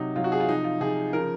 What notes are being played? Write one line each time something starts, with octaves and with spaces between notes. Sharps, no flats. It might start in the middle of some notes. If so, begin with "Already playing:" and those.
Already playing: C3 F#3 D#4
C3 F#3 F4
F#4
G#4
F4
C3 F3 D#4
F4
C3 F3 G#4
C#3 F3 A#4